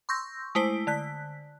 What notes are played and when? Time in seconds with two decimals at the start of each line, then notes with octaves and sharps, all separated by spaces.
0.09 C6 C#6 E6 G6 A#6
0.55 G#3 A3 E4 C5 B6 D7
0.87 D3 F#6 B6